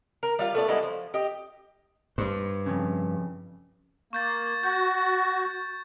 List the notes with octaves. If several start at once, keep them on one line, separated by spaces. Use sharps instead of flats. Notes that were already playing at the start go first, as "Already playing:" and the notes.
A#4
G3 F4 F5
A3 B3 D5
G3 G#3 B3 E4
F3
G4 D#5
G2 C5
F2 C#3
A#3 C#6 G6 A6
F#4 G6